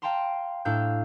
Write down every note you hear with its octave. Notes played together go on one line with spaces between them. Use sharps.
F5 G5 A5 A#5 C6
A2 D4 F5 A#5 E6 G6